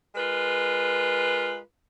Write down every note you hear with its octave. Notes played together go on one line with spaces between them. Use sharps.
G#3 F4 A#4 B4